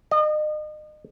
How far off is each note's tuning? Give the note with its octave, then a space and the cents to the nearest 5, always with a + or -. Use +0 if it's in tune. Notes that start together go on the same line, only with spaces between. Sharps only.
D#5 -35